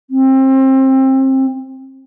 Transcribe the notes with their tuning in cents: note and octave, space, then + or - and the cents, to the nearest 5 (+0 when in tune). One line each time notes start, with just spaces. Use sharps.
C4 +25